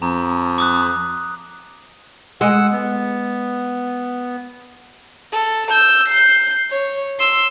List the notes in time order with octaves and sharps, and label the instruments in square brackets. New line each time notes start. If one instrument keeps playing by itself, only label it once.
[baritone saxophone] F2 [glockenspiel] A#5
[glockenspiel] D6 D#6 F#6
[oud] G#3 [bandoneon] F#5 E6
[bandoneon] B3
[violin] A4
E6 G6
G6 C7
C#5
C6 E6